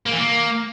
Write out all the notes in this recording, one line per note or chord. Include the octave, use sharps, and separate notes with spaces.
A#3
E3
A#3